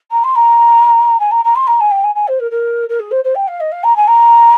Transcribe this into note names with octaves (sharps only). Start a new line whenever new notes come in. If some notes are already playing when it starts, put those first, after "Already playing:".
A#5
C6
A#5
G#5
A#5
A#5
C6
A#5
G#5
G5
G#5
G#5
C5
A#4
A#4
A#4
G#4
C5
C5
G5
F5
D#5
F5
A#5
G#5
A#5